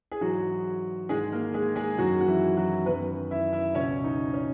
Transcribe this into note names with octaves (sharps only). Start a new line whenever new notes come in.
G#4
G#2 E3 F#3 F#4
G#2 D#3 G#3 G#4
A#3 A#4
G#3 G#4
G#3 G#4
F#2 D#3 F#3 F#4
F#4
E3 E4
F#3 F#4
F#2 D#3 B3 B4
E4 E5
E4 E5
C#2 B2 C#4 C#5
D#4
C#4